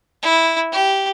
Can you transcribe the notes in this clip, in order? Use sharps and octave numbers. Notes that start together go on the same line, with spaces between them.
E4
G4